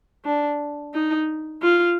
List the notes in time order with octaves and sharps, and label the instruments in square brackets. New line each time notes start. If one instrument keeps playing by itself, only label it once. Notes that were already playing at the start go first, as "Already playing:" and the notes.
[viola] D4
D#4
F4